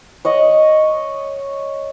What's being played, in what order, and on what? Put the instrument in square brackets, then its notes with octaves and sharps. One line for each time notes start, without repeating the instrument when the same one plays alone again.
[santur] C#5 D#5 F#5